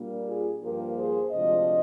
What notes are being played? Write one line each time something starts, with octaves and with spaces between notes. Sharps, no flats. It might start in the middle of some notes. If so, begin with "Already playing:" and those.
Already playing: A#2 G3 A#3 D4
F4 G#4
G2 F3 A#3 D4 G4 A#4
G#4 C5
D2 C3 F3 G#3 D4 C5 D#5